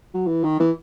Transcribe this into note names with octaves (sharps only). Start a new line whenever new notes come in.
F#3
E3
D#3
E3